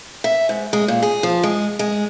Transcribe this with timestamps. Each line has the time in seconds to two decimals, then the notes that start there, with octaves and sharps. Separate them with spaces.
0.24 E5
0.49 G#2
0.73 G#3
0.88 A#2
1.02 G#4
1.23 F3
1.43 G#3
1.79 G#3